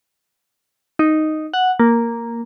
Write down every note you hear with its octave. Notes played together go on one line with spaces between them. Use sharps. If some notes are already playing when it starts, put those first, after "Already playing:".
D#4
F#5
A#3